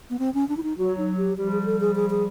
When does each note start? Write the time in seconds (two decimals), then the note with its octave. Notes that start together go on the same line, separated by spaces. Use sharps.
0.10 B3
0.19 C4
0.34 C#4
0.49 D4
0.57 E4
0.63 D#4
0.78 F#3 F#4
0.98 D#4
1.17 G4
1.37 F3 G3 G4
1.52 G#4
1.62 G#4
1.66 A4
1.80 G#4
1.95 G#4
2.10 G#4